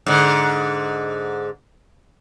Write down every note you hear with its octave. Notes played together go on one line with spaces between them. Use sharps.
G#2 D3